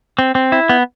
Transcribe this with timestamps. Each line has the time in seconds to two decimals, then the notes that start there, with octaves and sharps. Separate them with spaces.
0.19 C4
0.35 C4
0.52 E4
0.69 B3